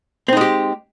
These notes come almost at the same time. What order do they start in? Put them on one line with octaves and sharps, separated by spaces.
C4 D#4 G#3 G4